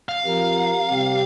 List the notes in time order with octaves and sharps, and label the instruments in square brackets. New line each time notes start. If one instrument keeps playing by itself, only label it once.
[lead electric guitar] F5
[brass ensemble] F3 C4 G4 A#4
C3 G3 C4 G4